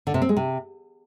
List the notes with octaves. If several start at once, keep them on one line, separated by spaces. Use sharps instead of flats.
D3
C3
C4
G#3
C3